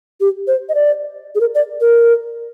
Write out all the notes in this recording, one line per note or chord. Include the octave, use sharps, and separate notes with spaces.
G4
C5
D#5
D5
G#4
A#4
D5
A#4